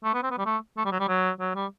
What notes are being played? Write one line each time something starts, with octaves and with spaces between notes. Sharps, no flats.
A3
B3
C4
B3
G3
A3
A3
G3
F#3
G3
F#3
F#3
G3